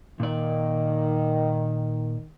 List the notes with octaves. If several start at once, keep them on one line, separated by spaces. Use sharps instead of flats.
A#2 D#3 D5